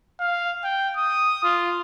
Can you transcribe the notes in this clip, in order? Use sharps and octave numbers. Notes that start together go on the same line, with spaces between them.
F5
G5
D#6
F4